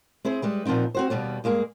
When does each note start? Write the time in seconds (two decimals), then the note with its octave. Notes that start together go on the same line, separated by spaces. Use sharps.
0.25 C4 E4 G#4 C5
0.42 G3 G#3 B4
0.65 A#2 F3 B3 C4 D#4
0.95 C4 F#4 C5
1.10 D#2 B2 G3 B3
1.44 G2 G#3 A#3 G#4